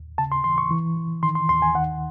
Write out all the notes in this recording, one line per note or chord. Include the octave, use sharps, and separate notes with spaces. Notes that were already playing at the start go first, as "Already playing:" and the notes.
Already playing: D#2
C#3 A5
C6
E3 C6
C#6
E3
E3
D#3 C6
C6
D#2 C6
G#5
D#3 F#5